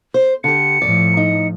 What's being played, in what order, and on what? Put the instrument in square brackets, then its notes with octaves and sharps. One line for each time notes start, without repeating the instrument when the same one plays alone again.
[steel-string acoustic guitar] C5
[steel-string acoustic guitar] D3 G4 [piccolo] C#7
[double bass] A2 F3 [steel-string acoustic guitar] D5
[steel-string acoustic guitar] D#4